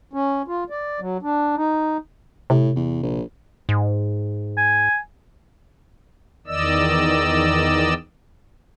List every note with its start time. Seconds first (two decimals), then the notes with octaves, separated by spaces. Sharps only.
0.13 C#4
0.48 F4
0.70 D5
1.00 F#3
1.23 D4
1.57 D#4
2.50 A2 C3
2.76 E2
3.03 A#1
3.69 G#2
4.57 G#5
6.47 E2 D#3 D5 D#5 E6